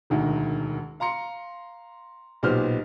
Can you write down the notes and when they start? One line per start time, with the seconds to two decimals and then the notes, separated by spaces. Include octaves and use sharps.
0.10 E1 D2 D#3
1.00 F5 A#5 C6 C#7
2.43 B1 A#2 B3 G4 C5 F6